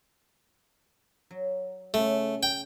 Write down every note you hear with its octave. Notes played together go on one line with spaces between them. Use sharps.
F#3
C#3 A3 C#4
G5